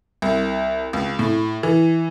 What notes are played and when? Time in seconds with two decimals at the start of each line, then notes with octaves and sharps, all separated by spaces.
0.22 C2
0.93 C#2
1.19 A2
1.63 E3